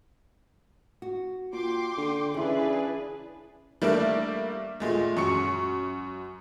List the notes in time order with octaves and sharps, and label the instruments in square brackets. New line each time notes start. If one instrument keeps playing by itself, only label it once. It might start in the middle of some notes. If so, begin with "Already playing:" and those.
[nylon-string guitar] F#4
[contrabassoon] A#2 [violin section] G5 C6 D6
[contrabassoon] D3
[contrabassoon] C#3 [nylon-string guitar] E3 E4 [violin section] D4 G#4 B4
[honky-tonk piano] G3 A3 A#3 D4 A#4 E5
A#2 G#3 A3
F#2 C#6 C#7